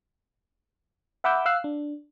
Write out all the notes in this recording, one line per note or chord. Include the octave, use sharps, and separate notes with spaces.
E5 F#5 B5 D6 E6 G6
F5 E6 F#6 C7
D4